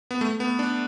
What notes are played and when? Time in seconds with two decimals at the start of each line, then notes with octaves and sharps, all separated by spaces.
0.11 B3
0.21 A3
0.40 B3
0.59 D4